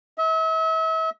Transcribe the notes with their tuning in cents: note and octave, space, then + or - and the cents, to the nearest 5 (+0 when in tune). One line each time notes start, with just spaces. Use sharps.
E5 -40